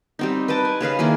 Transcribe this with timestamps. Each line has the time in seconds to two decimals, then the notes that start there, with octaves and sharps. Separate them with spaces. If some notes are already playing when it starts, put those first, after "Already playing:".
0.19 G3 C4 D#4
0.48 B4 D#5 G5 A5
0.65 G#5
0.81 C#3 G#4 B4 F5
0.99 D#3 A#3 E4 G#4